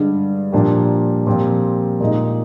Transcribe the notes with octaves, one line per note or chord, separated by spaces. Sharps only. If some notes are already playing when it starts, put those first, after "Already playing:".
Already playing: G2 D3 G#3
A#2 F3 A#3 D4 G4
A#2 F3 C4 G4
A#2 G#3 D#4